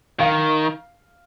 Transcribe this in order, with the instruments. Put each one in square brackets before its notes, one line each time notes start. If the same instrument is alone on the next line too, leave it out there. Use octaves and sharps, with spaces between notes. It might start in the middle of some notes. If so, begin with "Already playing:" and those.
[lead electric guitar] D#3 [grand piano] F5